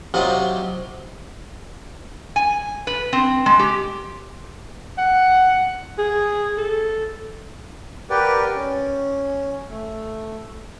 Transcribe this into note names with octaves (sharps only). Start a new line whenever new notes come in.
C3 F#3 D#4 F4 G4
G#5
B4
C4
G#3
G4
F#5
G#4
A4
G4 A#4 B4 D5 F#5 G5
C#4
A3